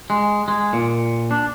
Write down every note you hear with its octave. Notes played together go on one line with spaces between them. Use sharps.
G#3
G#3
A#2
D4